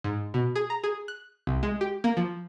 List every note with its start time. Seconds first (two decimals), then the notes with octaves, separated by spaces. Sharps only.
0.04 G#2
0.34 B2
0.56 G#4
0.70 A#5
0.84 G#4
1.08 F#6
1.47 C2
1.63 G#3
1.81 G4
2.04 A#3
2.17 F3